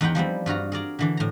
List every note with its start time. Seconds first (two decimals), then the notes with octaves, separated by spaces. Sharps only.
0.01 E2 D#4 B4 F#5 G5
0.15 F3 G3 B3 C4
0.46 G2 F4 F#4 A#5
0.72 G#4 A#4 D5 A#5
0.99 D3 E3 D4
1.17 A2 A#5